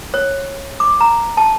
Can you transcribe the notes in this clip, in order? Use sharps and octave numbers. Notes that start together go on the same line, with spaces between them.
C#5
D6
A#5
A5